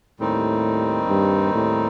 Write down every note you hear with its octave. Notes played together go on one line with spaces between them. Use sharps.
D#2 A2 D#3 G3 C4 D#4
G2
A2